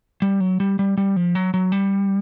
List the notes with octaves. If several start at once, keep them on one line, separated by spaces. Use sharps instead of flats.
G3
F#3
G3
G3
G3
F3
F#3
F#3
G3